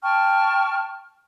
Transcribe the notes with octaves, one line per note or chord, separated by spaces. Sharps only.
G5 A5 C#6 F6